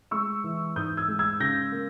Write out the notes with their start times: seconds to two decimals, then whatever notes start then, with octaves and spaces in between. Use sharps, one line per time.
0.11 G#3 C#6 E6
0.44 E3
0.76 G#2 D#6 G6
0.97 E6 G#6
1.08 G#3
1.19 E6 G#6
1.40 C#3 G6 A#6
1.72 A#3